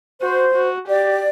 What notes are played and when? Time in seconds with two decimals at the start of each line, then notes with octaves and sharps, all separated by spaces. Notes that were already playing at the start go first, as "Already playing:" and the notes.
0.22 F#4 C5
0.55 F#4
0.88 G4 D5